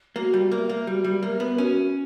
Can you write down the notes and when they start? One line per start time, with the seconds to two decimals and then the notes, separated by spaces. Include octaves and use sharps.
0.16 A#3 F#4
0.34 G3
0.51 A#3 A#4 E5
0.69 A#3
0.87 G3 F#4
1.04 G3
1.22 A#3 A#4 E5
1.40 B3
1.58 C#4 F#4